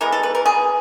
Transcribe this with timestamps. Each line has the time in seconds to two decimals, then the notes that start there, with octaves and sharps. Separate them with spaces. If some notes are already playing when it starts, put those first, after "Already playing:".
0.01 E3 G#3 B3 A#4
0.12 A4
0.23 B4
0.35 A#4
0.46 G#4